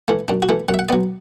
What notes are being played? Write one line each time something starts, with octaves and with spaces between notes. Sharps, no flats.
E3 A3
F#2 D4
F#4
E3 A3
F#2 F#5
E5
F#5
F#3 B3 D5